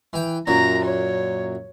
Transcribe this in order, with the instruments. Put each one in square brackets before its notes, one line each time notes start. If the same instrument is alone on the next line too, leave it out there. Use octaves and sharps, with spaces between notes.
[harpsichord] E3 G5
[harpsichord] F#2 A#2 F#3 [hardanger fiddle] A#5
[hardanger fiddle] C#5